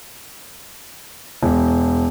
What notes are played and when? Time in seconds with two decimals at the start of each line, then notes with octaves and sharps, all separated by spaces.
1.43 E1